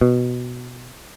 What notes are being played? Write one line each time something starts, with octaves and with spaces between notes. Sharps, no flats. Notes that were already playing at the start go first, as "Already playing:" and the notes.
B2